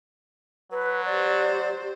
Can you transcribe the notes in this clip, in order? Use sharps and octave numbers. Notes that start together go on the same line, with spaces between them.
F#3 B4
G4 C5 D5